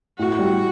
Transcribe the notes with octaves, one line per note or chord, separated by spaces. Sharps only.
A2 F#4
G3